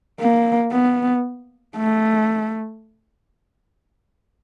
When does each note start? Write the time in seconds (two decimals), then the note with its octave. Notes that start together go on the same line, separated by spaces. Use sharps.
0.20 A#3
0.72 B3
1.76 A3